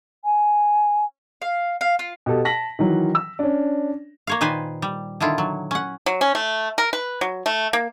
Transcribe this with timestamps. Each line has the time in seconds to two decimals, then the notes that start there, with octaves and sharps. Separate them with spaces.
0.25 G#5
1.42 F5
1.81 F5
1.99 F4
2.26 B2 G4 A4
2.45 A5 A#6 B6 F#7
2.79 D#3 E3 F#3
3.15 E6
3.39 C#4 D4
4.27 A#3 C#5 F5
4.41 A#2 D#3 B4 C5 G#5
4.82 G3
5.20 D3 D#3 E4 F4
5.38 F#3
5.71 C#4 F#5
6.06 F#3
6.21 C#4
6.35 A3
6.78 A#4
6.93 B4
7.21 F#3
7.46 A3
7.73 A#3